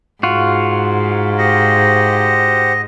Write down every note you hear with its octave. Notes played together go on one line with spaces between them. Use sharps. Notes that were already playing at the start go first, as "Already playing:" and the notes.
G#2 F4 F#4
G4 C5 D#5 F#5